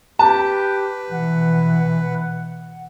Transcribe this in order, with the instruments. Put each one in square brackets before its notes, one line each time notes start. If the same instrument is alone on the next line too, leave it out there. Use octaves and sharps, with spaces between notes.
[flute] G4 [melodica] B4 [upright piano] A5
[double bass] B2 E3 [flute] F#5